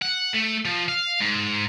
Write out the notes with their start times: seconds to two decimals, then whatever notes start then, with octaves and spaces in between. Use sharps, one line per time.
0.02 F#5
0.34 A3
0.65 F3
0.88 F5
1.20 G#2